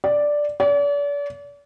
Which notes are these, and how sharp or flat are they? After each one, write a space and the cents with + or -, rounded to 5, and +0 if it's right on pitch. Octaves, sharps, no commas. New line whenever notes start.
D5 +0
D5 -40